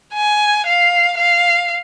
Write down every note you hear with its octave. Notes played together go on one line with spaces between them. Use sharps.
G#5
F5
F5